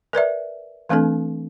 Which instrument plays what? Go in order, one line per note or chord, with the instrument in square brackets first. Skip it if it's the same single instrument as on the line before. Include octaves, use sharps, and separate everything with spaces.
[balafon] A#4 B4 D5 E5
E3 A3 C4 D4 A4